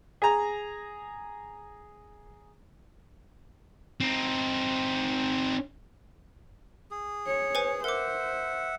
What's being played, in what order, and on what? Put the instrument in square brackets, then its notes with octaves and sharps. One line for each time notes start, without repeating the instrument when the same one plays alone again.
[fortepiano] G#4 A#5
[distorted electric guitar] C4 D#4
[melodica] G#4
[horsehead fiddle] C#5
[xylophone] B4 C5 G#5
[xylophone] A#4 D6 [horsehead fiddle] C5 [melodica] E5 F#5